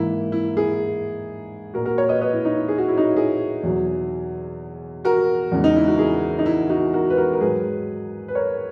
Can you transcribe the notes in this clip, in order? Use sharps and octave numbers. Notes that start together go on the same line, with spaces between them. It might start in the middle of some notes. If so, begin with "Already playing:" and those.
Already playing: G#2 E3 A#3 E4
E4
E4 G#4
A#2 A#3 F#4 A#4
F#4 A#4
A#4 C#5
B4 D#5
B4 D#5
E4
D#4
E4
G#4
F#4
E4
D#4 F#4
E4 G#4
E2 B2 F#3
F#4 A#4
E2 C#3 E3 G#3
D#4
E4
F#4
E4 G#4
D#4
E4
D#4 F#4
F#4 A#4
B4
F#4 A#4
A#4
G#2 D#3 F#3 G#4 B4
B4
A#4 C#5